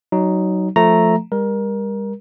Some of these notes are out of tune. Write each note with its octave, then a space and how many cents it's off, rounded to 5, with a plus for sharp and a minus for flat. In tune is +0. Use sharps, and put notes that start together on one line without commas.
F#3 +20 D#4 +0
F3 +0 A3 +0 A#5 +0
G3 +40 A#4 +20